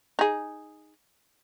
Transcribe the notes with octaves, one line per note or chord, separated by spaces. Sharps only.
D#4 G#4